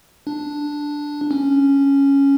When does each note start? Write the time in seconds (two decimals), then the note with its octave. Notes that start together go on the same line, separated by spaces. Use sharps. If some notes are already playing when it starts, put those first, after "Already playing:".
0.27 D4
1.31 C#4